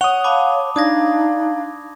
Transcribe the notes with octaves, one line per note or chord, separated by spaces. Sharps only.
C#5 F#5 C#6 D#6 F7 G7
F5 A5 B5 D6
D4 D#4 F5 D#6 G#6 A#6